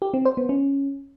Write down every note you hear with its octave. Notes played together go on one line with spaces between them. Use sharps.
G4
C4
C5
B3
C#4